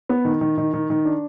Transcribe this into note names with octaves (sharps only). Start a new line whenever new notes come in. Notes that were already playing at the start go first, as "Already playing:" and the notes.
B3
D#3
D#3
D#3
D#3
D#3
D4